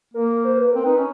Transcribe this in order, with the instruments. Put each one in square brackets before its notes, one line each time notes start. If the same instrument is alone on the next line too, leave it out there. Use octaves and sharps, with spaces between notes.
[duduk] A#3 [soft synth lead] A#4
[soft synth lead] A#4
C5
B4
[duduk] C4 [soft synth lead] A#4
[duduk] D#4 [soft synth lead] B4
[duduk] C#4